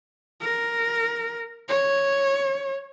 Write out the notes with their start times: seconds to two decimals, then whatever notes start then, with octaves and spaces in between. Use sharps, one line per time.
0.41 A#4
1.69 C#5